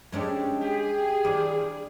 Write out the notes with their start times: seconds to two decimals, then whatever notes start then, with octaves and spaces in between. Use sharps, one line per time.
0.12 G#3 C#4 D4 G4 A4
0.61 G4 G#4
1.25 D#2 D4